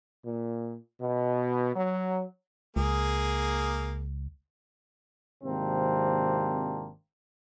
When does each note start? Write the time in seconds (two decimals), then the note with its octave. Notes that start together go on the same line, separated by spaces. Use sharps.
0.25 A#2
1.00 B2
1.74 F#3
2.76 C#2 A#3 G#4
5.44 G#1 C3 A#3 C4 D4